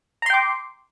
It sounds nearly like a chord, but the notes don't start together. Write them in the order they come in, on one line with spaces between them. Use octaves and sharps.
A#5 C6 G5 D6